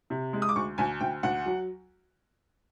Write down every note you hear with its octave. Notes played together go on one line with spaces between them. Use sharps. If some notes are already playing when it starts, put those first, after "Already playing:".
C3
G#3
D#6
D6
D2 C#6
D2 G#5
D2 G5
D2 F#5
F#3